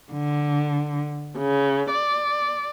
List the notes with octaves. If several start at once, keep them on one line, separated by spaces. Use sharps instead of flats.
D3
C#3
D5